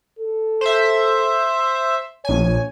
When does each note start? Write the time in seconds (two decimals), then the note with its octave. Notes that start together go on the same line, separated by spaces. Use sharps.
0.19 A4
0.61 C5 E5
2.25 A#1 C#5 G#5